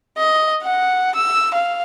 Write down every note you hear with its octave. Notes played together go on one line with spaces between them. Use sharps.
D#5
F#5
E6
F5